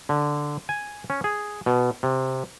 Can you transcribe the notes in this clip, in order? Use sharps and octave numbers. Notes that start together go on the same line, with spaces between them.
D3
G#5
C#4
G#4
B2
C3